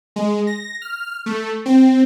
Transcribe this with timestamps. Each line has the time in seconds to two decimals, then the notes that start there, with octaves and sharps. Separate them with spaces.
0.16 G#3
0.47 A#6
0.82 F6
1.26 A3
1.66 C4